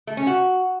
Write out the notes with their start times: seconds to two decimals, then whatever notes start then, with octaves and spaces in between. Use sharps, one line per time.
0.07 A3
0.17 C#4
0.27 F#4